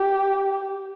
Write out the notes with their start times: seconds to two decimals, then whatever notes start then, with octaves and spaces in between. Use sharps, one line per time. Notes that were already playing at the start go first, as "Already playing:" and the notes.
Already playing: G4